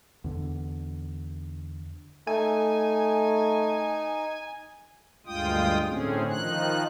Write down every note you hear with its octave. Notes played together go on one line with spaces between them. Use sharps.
E2 D3
A3 D#4 G#5
D2 G2 G#3 F4 G5 D#6
A2 D3 C4 C#4 G#4
D#3 F3 D#4 F#6